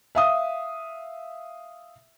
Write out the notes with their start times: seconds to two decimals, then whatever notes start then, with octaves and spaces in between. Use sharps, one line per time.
0.15 E5 F5 D#6